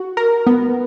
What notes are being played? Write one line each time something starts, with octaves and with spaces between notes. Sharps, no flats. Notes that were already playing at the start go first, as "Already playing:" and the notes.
Already playing: F#4
A#4
B3